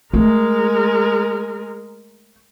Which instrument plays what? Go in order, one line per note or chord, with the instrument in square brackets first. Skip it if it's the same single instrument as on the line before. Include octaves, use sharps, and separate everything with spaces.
[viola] G#3 A#4 [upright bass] A3